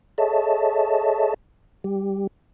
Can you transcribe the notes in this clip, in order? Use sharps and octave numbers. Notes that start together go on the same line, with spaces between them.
G#4 A4 C#5 D#5 E5 A5
G3 G4